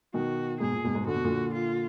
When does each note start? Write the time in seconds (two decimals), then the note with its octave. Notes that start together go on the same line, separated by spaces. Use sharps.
0.14 B2 D#3 F#4
0.60 G#2 B2 G#4
0.72 A#2
0.84 G#2 B2
0.95 G#2 B2
1.07 D3 F#4
1.15 B2
1.24 A#2 D3
1.54 F4